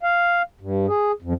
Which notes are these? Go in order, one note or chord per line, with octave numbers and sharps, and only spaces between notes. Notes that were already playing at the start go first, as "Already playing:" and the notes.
F5
G2
G#4
F2